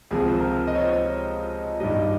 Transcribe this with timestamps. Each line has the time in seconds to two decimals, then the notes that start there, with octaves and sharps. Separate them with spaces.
0.11 C#2 C3 F3 G#4
0.29 C5
0.40 A#4
0.67 D#5
0.75 C#5
0.81 C5
0.89 C#5
1.80 G2 D#3 G3 D#5